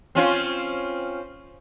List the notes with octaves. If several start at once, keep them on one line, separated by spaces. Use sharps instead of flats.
C4 C#4 F4